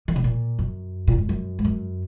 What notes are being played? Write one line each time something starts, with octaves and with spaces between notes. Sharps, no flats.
D#3
C#3
A#2
F#2
A#2
G#2
F#2
G#2
F#2